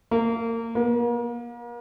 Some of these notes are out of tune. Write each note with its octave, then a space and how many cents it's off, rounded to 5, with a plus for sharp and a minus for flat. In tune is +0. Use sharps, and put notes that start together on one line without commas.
A#3 -25
A#3 +40